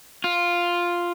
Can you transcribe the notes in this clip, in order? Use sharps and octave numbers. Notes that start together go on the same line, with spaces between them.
F4